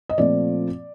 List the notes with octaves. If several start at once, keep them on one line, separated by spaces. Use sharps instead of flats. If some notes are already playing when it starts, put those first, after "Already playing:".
D#5
A#2 F3 A3 C4 D5